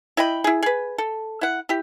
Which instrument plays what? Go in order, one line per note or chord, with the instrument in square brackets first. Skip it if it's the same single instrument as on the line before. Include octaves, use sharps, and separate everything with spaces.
[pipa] E4 D#5 G5 B5
E4 G#4
G#4 B4
A4
E4 F#5
E4 G4